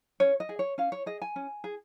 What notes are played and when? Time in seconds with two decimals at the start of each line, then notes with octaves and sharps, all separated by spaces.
0.20 C#4 C#5
0.40 D#5
0.49 G#4
0.59 C#5
0.78 C#4 F5
0.92 C#5
1.06 G#4 D#5
1.22 G#5
1.36 C#4
1.64 G#4